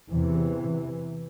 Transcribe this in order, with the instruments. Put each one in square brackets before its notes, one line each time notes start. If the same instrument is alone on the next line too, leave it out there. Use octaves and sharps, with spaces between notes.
[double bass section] E2 C3 E3